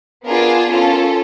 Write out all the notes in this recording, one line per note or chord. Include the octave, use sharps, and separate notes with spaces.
B3 D4 F4 G#4 A#4
C#4 F4 A4 A#4